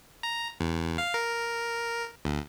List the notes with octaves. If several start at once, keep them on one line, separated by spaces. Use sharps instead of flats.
A#5
E2
F5
A#4
D2